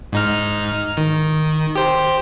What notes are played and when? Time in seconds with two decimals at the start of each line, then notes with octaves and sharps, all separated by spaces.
0.12 G#2 D#4 F6
0.97 D#3
1.76 G4 C5